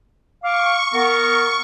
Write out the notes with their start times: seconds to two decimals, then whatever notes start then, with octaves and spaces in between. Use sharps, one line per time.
0.44 F5 C#6 D6
0.94 B3 A#4